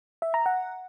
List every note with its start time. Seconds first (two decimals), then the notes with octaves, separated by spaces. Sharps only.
0.22 E5
0.34 A#5
0.46 F#5